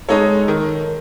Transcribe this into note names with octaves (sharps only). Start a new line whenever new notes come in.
G#3 D#4 A4 C#5
D#3